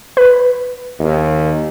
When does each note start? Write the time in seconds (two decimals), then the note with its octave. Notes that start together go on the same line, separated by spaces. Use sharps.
0.17 B4
1.00 D#2